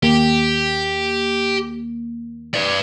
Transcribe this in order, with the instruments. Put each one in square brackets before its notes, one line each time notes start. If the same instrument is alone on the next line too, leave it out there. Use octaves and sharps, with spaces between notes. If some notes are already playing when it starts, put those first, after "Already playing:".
[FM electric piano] D#2 A#3 [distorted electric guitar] G4
[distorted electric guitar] B4 D5